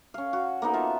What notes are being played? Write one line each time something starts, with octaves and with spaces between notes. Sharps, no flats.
C#4 F5
F#4
A#3 B3 D#4
F4 E5 A5